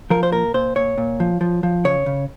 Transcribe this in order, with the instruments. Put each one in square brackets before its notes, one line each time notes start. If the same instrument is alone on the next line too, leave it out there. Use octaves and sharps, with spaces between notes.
[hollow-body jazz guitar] F3 A#4
C5
A#2 A#4
A#2 C5
A#2 C#5
A#2
F3
F3
F3
C#3 C#5
C#3